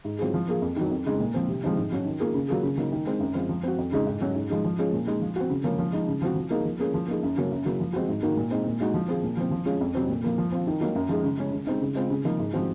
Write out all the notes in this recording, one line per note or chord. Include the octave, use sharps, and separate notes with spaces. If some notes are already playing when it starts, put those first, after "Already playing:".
G#2
F#3 C4 F4 G#4
F3
A#3 F4 G#4
F2
D#3 F#3
F2
C#3 G#3 D#4
A#2
F3 C4
C3
F3 G#3 C4 D#4
G#2
F#3 C#4 F#4
D#3
A#3 F4 G#4
C#3
F#3 A#3 F4 G#4
C#3
F#3 A#3 D#4
D#3
G#3 C4
F#2
F3 G#3 C4 F4
F3
C4 F#4
F2
C#3 G#3 D#4 G#4
G#2
F#3 C#4 F#4
G#2
F3 G#3 D#4 G#4
F3
G#3 C#4 F4 G#4
A#2
G#3 D#4
F3
C4 F#4
C#3
F3 A#3 C#4
F3
G#3 D#4
C#3
F3 C4 F#4
F3
A#3 D#4 G#4
F3
A#3 C#4 G#4
F3
A#3 D#4 G#4
F#2
C#3 F#3 A#3 C#4
F#2
C#3 F#3 A#3
F3
G#3 C4 F#4
G#2
D#3 A#3 D#4 F#4
A#2
G#3 C4 D#4
A#2
G#3 D#4 F#4
F3
C4 F4 G#4
A#2
F3 C4
F3
G#3 C#4 F4 G#4
F2
C3 F#3 C4
A#2
F3 A#3
F3
C4 F4
D#3
F#3 A#3 D#4 F#4
F#2
F3 G#3 D#4 G#4
C#3
G#3 C#4
C#3
G#3 C4 D#4
C#3
G#3 C4 F4
C#3
F3 A#3 D#4
G#2
F3 C4 F#4